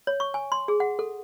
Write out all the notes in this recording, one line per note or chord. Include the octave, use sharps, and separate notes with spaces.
C#5
C#6
G#5
C6
G#4
F#5
A4